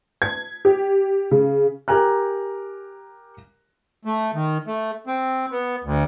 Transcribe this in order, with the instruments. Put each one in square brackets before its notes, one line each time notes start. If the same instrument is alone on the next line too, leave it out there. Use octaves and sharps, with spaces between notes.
[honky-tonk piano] G#6
G4
C#3
[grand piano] G4 A#4 G#5 A#5 F#6
[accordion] A3
D#3
A3
C4
B3
D2